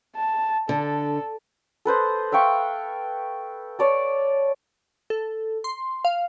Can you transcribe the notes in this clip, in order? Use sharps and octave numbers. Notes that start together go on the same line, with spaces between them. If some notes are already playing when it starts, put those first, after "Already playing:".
A5
D3 A4
A4 B4 C5 D#5
E5 F5 G5 C#6
C#5 D5 A5
A4
C6
F5